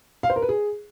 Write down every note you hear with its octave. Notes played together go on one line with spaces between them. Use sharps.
F5
C5
A#4
B4
G#4